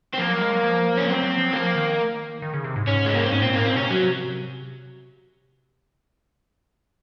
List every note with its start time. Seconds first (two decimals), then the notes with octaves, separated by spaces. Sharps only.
0.14 C4
0.19 F3 A#3
0.30 F#3
0.41 G#3
0.53 F#3
0.64 F3
0.97 C#4
1.08 F#3 C4
1.23 F#3
1.38 F3
1.46 F#3
1.53 F3 A#3
1.75 D#3
2.42 D#3
2.54 C#3
2.64 C3
2.76 G#2
2.87 G#2 C#4
3.06 G#3
3.14 A#3
3.23 C4
3.32 G#2 C#4
3.42 A#2 C4
3.54 G#2 A#3
3.65 A#2 C4
3.76 C3 C#4
3.91 F#3